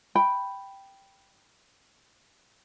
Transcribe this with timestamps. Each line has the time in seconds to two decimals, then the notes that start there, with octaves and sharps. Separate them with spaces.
0.15 G5 B5